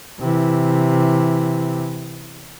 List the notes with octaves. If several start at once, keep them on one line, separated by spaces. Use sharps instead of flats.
C3 E3